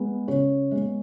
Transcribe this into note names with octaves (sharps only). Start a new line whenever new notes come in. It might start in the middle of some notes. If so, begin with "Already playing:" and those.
Already playing: G#3 B3
C#3 C#5
G#3 B3